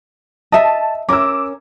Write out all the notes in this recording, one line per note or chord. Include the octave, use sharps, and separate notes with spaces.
D#5 E5 A5
C#4 A#4 D6 E6